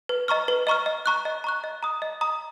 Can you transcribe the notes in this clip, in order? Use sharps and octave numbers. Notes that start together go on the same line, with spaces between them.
B4
D#5 A#5 C#6 F6
B4
D#5 A#5 C#6 F6
D#5
A#5 C#6 F#6
D#5
A#5 C#6 F#6
D#5
A#5 D#6
D#5
A#5 D#6